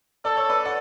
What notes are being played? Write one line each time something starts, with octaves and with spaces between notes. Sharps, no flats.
A4 D5
C#5
B4 D5
D5 F#5